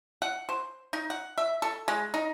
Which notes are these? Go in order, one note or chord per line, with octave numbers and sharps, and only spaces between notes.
F#5
C5
D#4
F#5
E5
A4
G#3
D#4